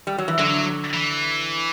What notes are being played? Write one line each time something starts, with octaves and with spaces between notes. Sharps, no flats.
G3
F#3
E3
D3 F#3
E3